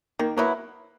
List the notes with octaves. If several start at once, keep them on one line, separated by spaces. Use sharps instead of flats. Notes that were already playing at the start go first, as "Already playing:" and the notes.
D#3 A#3
F#3 A#3 B3 E4